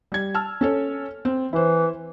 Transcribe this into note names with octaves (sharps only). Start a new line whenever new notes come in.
G3 G#6
A5 E6 F6
C#4 A4 C#5
C4
E3 E4 C5